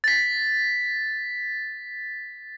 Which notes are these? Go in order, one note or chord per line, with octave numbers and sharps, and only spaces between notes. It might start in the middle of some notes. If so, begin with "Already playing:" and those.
A6 B6